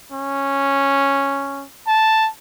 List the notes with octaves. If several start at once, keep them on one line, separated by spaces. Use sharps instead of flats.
C#4
A5